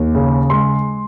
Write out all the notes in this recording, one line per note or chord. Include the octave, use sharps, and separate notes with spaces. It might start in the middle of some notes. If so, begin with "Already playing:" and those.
Already playing: D#2
C#3
G#3 C6